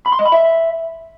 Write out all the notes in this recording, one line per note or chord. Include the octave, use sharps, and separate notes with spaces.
B5
C6
D#5
B5
E5